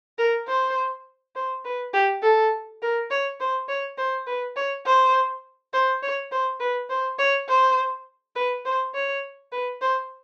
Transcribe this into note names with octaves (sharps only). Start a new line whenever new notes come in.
A#4
C5
C5
B4
G4
A4
A#4
C#5
C5
C#5
C5
B4
C#5
C5
C5
C#5
C5
B4
C5
C#5
C5
B4
C5
C#5
B4
C5